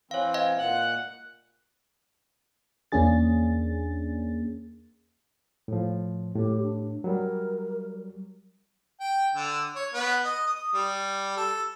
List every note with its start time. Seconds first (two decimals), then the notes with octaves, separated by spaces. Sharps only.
0.11 E3 C4 C#5 F5
0.34 D#5 F5
0.58 A#2 F#5 F#6
2.92 E2 A#3 C#4 D4 G#4 A6
5.68 A2 F3
6.35 A2 G4
6.63 D4
7.04 F#3 G3 A#4
9.00 G5
9.35 D3
9.76 C#5
9.94 B3
10.24 D#5
10.47 D#6
10.74 G3
11.37 A4